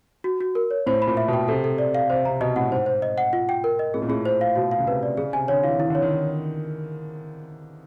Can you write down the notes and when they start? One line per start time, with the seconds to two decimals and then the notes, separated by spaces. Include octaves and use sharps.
0.24 F#4
0.41 F#4
0.55 A#4
0.71 C#5
0.87 A2 C5
1.02 B5
1.07 A#2
1.17 E5
1.28 B2
1.33 G5
1.48 C3 A4
1.64 A4
1.78 D5
1.95 F5
2.10 C3 C5
2.25 C3 A#5
2.41 B2 D#5
2.56 A2 F#5
2.72 G#2 C5
2.86 C5
3.02 D#5
3.18 F#5
3.33 F4
3.49 G5
3.64 A#4
3.79 D#5
3.94 A2 G#4
4.02 A#2
4.09 A2 G#4
4.25 C5
4.41 F5
4.56 B2 F#4
4.71 F5
4.79 C#3
4.87 C3 B4
5.03 D5
5.17 C#3 G#4
5.33 C3 G#5
5.48 D3 C#5
5.63 E3 F5
5.76 D#3 E4
5.90 D3 C#5
6.02 D#3